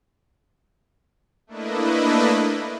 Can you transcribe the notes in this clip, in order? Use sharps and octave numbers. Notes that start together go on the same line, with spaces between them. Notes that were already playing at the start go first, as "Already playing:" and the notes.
A3 A#3 D4 E4 B4 D#5